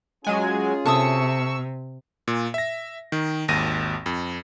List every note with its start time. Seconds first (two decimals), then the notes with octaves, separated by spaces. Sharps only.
0.24 F#3 G#3 C#4 F4 G#4 G#5
0.86 C3 A4 E5 C#6 D#6 E6
2.28 A#2
2.54 E5 A#6
3.12 D#3
3.48 G#1 D#2 A#6 D#7
4.06 F2